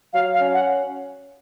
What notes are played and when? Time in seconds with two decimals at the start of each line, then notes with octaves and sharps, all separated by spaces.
0.13 F#3 F5
0.34 F5
0.40 C#4
0.53 F#5